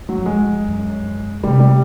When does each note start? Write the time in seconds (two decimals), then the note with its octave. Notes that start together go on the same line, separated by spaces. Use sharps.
0.09 F#3
0.18 F2
0.26 G#3
0.42 F2
0.68 F#2
1.43 C3 G3
1.60 G3